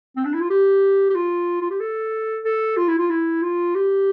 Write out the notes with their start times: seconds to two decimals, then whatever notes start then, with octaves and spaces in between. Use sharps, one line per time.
0.17 C4
0.25 D4
0.34 E4
0.41 F4
0.50 G4
1.10 G4
1.15 F4
1.61 F4
1.70 G4
1.80 A4
2.45 A4
2.77 F4
2.88 E4
2.98 F4
3.10 E4
3.42 F4
3.75 G4